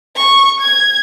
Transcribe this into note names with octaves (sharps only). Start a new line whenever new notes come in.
C#6
G#6